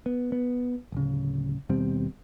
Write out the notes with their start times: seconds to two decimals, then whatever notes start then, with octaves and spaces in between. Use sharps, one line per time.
0.06 B3
0.32 B3
0.92 D1 C#3
1.69 D#2 B2 G3 C4